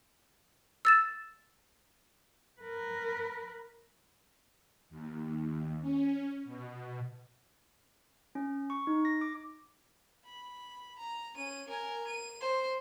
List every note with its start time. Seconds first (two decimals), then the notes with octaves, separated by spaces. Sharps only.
0.85 E6 A6 E7
2.61 A#4 B4
4.90 D#2
5.81 C#4
6.45 B2
8.35 C#4
8.70 C#6
8.87 D#4
9.05 A#6
9.21 D6
10.25 B5
10.98 A#5
11.36 C#4 D#7
11.68 A#4 G#5
12.07 D#7
12.40 C5